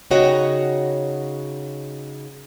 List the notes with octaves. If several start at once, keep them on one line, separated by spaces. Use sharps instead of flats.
C#3 D#4 F#4 C#5 D#5 G5